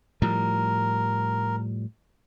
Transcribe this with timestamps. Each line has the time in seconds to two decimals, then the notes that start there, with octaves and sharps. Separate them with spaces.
0.22 A2 F3 G3 A#4